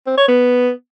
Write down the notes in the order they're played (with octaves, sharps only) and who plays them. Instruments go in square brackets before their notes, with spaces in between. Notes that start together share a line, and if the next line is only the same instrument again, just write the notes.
[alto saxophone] C4
C#5
B3